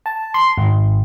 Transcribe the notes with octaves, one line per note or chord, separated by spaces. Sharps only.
A5
C6
G#1